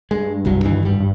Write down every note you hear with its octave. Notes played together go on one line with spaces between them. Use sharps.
G2 G#3
F1 C2 F#3
D2 D#3 E3
G#1 G3
G2